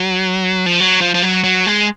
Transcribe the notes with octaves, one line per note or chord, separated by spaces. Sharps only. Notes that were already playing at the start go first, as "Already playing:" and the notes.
Already playing: F#3
F3
F#3
F3
F3
F#3
F#3
G#3